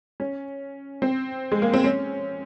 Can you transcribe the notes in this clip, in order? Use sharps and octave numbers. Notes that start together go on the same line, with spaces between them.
C#4
C4
G#3
A#3
C4
C#4